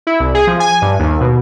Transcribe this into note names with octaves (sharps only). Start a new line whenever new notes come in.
E4
C2
G#4
F3
G#5
G2
D#2
B2